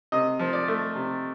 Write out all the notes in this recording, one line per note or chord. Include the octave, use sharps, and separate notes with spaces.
C3 D#5
F3
D5
A3
C3